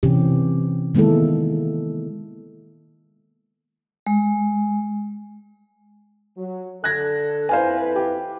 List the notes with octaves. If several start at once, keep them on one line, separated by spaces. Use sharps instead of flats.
C3 E3 C4 C#4 G4
D#3 G#3 A#3 B3 E4 A4
G#3
F#3
D3 A4 F#6 G#6 A#6
F2 E4 B4 C5 F5 G#5
G4